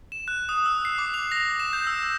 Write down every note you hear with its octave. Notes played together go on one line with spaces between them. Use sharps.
E7
F#6
D#6
E6
C7
D6
F7
A#6
E7
G6
E6
G6